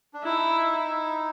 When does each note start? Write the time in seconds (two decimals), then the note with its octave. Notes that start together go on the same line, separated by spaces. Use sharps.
0.14 D4
0.24 D#4 E4